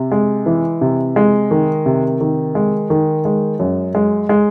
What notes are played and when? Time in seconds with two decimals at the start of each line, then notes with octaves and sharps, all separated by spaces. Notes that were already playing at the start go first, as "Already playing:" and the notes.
Already playing: C3
0.11 G#3
0.46 E3
0.81 C3
1.16 G#3
1.51 D#3
1.86 C3
2.21 D#3
2.55 G#3
2.90 D#3
3.25 G#3
3.60 F#2
3.95 G#3
4.29 G#3